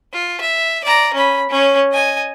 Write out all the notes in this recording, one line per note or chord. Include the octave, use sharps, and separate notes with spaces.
F4
E5
D5 A#5
C#4 B5
C#4 C#5
D#5 G#5